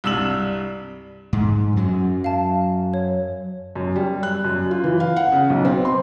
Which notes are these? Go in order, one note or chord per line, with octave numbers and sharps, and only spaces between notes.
C2 G2 E6 E7 F#7
G#2
F#2 F#3
F5 A5
C#5
F#2
G3
F#6
F#2
F4
E3
F5
F#5
C#3
B1
C4
C6